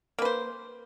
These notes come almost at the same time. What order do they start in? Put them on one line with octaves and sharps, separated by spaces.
A#3 B4 C5